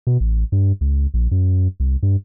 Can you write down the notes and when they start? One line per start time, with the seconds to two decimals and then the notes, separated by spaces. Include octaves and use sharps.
0.07 B2
0.20 A1
0.52 G2
0.81 C#2
1.14 A#1
1.31 F#2
1.80 C2
2.03 G2